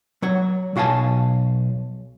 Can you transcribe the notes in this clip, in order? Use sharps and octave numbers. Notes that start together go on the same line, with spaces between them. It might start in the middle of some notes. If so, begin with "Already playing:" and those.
F#3 C#5
B1 F#4 F5 G#5 A5